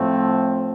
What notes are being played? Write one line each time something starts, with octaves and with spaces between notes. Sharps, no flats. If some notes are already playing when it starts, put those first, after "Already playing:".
Already playing: A2 F3 A3 C4